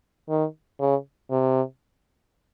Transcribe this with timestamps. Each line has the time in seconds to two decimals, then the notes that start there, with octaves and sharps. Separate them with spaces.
0.29 D#3
0.80 C#3
1.31 C3